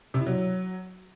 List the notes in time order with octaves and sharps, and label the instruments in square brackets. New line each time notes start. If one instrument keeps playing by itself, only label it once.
[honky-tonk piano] C3
E4
F#3